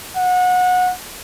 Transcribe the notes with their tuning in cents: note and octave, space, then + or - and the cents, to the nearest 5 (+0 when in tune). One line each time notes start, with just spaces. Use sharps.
F#5 -25